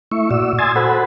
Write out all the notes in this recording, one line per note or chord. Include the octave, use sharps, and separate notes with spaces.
A3 E4 E5 C#6
A#2 F#4 D5 E6
G#5 C6 D#6 E6 G#6 A6
F#4 A4 C5 F#5 B5